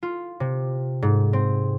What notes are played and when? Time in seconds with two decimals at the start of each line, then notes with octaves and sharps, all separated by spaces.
0.03 F4
0.40 C3
1.02 G#2
1.33 C4